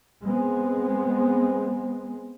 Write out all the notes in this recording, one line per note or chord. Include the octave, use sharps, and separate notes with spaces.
G#3 B3 C4